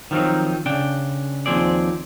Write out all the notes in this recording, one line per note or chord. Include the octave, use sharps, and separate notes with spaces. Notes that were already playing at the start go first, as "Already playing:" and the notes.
D#3 F3 F#3 C4 D#4
C#3 D4 G5
D#2 D#3 F3 C4 G#4 D5